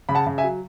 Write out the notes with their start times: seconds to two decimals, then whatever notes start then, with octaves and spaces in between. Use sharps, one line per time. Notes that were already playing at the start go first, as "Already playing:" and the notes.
0.09 C#3 B5
0.15 F#5 A5
0.27 C#3
0.38 E5 G#5
0.44 F#3